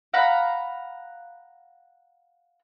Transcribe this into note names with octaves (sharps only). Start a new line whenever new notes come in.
F5 F#5 A#5 B5